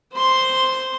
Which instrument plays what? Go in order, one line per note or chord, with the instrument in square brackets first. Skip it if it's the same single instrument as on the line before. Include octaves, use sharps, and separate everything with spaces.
[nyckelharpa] C5 C6